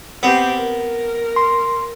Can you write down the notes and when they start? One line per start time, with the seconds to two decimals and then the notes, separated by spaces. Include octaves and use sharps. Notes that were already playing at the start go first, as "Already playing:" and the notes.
0.23 B3 C4 G4
0.57 A#4
1.36 C6